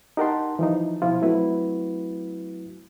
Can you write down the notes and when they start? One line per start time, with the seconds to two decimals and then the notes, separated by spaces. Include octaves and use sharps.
0.17 D#4 G4 A#4 F#5 A5 C6
0.59 E3 F3 D#4
1.02 B2 F3 E4 F4
1.22 F#3 A3 C4 E4 F#4 B4